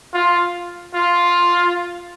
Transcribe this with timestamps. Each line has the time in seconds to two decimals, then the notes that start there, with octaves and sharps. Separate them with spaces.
0.13 F4
0.95 F4